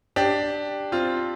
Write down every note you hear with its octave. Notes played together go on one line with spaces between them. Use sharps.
D4 G4
C4 F4